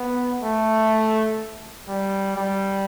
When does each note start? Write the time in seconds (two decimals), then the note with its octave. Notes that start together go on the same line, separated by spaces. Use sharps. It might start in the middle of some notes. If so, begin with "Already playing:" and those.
Already playing: B3
0.42 A3
1.88 G3
2.36 G3